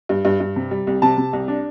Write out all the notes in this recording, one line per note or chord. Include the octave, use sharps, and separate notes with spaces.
G2
G2
G2
C3
G3
C2
C3 A5
C3
C2
D4